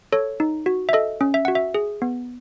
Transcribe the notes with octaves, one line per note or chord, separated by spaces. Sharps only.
A4 C#5
D#4
F#4
E5
A4 D#5
C#4
E5
F#4 F#5
E5
G#4
B3